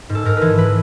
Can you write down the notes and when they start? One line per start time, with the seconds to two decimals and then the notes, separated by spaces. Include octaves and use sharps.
0.09 G#2
0.15 A4
0.25 G#2 A#4
0.37 E3 B4
0.58 E3 B4